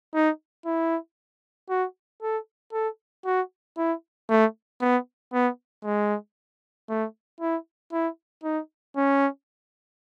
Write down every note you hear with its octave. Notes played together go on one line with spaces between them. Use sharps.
D#4
E4
F#4
A4
A4
F#4
E4
A3
B3
B3
G#3
A3
E4
E4
D#4
C#4